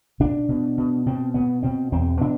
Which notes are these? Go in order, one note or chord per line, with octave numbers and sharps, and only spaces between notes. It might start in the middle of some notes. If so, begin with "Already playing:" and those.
B2 D4
B2
B2
B2 C4
B2 B3
B2 C4
E2 C4
B2 D4